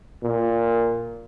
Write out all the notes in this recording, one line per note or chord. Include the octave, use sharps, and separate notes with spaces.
A#2